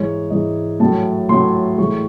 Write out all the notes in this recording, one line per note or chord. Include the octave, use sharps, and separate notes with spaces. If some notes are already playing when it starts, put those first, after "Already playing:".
Already playing: G#2 E3 G#3 C#5
G#2 E3 G#3 D#5
A2 F#3 A3 A5
A2 F#3 A3 C6
A2 E3 G#3 C#6